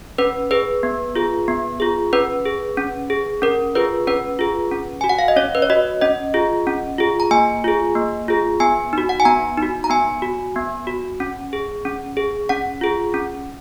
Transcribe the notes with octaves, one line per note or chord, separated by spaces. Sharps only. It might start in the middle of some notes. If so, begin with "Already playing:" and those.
C#4 B4
G#4 B4
B3
F4 G#4
B3
F4 G#4
C#4 B4
G#4
C#4
G#4
C#4 A#4
F4 G#4 B4
C#4 B4
F4 G#4
C#4
F#4 G#5
F#5
F5
D#5
C#4 C#5
B4
C#5
F#4 D#5
C#4 D#5
F4 G#4
C#4
F4 G#4
A#5
A#3 G#5
F4 G#4
A#3
F4 G#4
B3 G#5
D#4 F#4
F#5
G#5
B3 A#5
D#4
F#4
A#5
B3 G#5
F#4
B3
F#4
C#4
G#4
C#4
G#4
C#4 F#5
F4 G#4
C#4